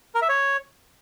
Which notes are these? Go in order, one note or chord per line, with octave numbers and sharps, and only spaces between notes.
A#4
E5
C#5